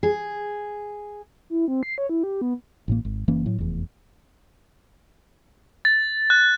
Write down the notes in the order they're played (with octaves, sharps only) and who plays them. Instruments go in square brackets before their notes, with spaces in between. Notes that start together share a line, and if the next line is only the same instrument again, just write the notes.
[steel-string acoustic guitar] G#4
[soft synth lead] E4
C4
C7
C#5
E4
G4
B3
[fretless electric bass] A1 A2 A#3
G#1
F#1 E3 A#3 C#4
A2 F#3
F1 E2
[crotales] A6
F#6